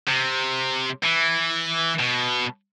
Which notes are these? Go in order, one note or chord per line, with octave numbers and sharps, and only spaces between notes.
C3
E3
B2